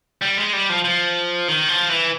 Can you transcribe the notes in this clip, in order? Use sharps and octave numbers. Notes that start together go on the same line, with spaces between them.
G3
G#3
G3
F3
F3
D#3
F3
E3